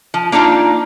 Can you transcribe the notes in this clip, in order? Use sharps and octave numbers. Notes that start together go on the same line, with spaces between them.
F3
A#3 D4 D#4 F4